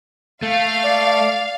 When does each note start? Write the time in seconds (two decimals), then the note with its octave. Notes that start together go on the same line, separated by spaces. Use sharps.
0.43 A3 F5
0.84 D5